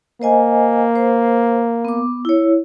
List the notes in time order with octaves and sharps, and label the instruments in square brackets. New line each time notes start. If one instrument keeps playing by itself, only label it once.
[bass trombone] A#3 [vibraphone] C5 D#5 G#5
[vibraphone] C5
B3 D6
E4 C#5